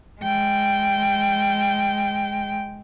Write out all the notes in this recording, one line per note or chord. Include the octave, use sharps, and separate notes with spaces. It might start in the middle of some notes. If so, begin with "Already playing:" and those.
G#3 G5